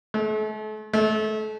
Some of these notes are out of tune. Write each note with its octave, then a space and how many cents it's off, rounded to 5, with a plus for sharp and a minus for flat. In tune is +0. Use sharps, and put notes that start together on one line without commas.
A3 -40
A3 -30